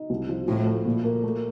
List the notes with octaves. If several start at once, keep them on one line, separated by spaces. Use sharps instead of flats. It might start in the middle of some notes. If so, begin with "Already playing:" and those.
Already playing: D#4
C2
F3
A2 F3
A3
A#2
A#3
A3